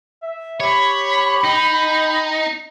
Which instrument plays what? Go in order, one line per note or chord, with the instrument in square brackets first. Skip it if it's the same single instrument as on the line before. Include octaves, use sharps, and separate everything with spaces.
[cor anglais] E5
[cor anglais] G4 [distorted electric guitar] C#5 [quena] B5
[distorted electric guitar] D#4 [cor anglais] G5